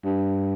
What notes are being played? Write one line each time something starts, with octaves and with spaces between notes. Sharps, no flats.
G2